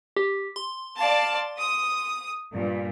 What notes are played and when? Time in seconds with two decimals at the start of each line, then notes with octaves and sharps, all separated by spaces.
0.17 G4
0.56 C6
0.97 D5 F5 A5
1.58 D#6
2.53 G2 A#2